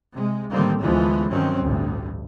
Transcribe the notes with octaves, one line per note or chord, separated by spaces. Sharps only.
C3 G#3
A1 D3 D#3 G3 A#3 C4
D2 D3 E3 F3 G#3 B3
G2 D#3 F#3 C4 C#4
A1 D2 G2